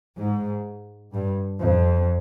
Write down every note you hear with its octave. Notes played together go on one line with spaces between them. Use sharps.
G#2
G2
F2